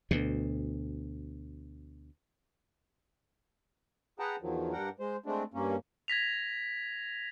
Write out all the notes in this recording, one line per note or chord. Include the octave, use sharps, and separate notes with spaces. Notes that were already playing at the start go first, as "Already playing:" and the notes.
D2 B2
G#4 B4 F#5 G5 A5 A#5
E2 D#3 F3 F#3
G2 D4 A#4 F#5 G5
G#3 C5
G#3 A3 C4 D4
G2 A#3 C#4
G#6 A#6 B6 F7